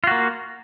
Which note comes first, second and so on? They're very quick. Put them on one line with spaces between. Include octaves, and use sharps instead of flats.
F4 F#4 A#3